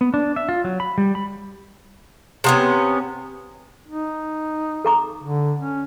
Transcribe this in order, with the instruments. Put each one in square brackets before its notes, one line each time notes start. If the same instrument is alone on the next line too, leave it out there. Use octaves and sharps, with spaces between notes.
[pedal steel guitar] B3
D4
E5
F4
F#3
B5
G3
B5
[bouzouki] C3 B3 C#4
[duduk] D#4
[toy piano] A4 A#5 D6
[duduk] D3
C#4